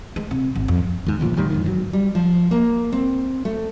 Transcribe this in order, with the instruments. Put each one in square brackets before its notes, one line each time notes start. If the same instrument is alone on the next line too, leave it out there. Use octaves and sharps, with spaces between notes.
[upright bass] G#3
C3
G#1
F2
[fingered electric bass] D#2 G#2
G#1 D2 A#2 F3
E1 A1 D#3 G3
F2 G#2 D#3
G1 A#2 F#3
[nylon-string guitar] G3
F3
A#3
C4
A3